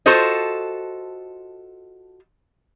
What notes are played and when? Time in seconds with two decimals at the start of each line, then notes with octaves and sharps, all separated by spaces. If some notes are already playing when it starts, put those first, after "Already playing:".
0.06 F4 F#4 A4 C5 D#5